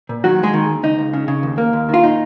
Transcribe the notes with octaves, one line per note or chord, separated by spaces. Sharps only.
A#2
D#3 F#3 F#4
D#2 G#3 G#4
D#3
D#2
C#2 D#4
C#2
C#3
C#3
D#2
A#3
D#2
D#3 F4
A#2 D#4